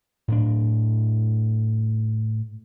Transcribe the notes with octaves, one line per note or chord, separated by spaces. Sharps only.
A2 D4